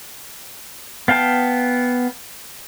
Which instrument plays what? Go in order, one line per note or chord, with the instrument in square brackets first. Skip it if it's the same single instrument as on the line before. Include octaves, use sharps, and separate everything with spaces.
[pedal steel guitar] B3 F5 G5 A5